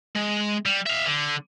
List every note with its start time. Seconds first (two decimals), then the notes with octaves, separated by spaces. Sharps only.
0.15 G#3
0.66 G3
0.87 E5 F5
1.06 D3